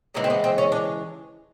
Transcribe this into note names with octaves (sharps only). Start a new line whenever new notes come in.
C#3 E3 G#3 A#3
C4
B3
C4
C#4
D4